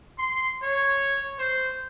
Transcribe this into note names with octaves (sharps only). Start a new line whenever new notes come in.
C6
C#5
C5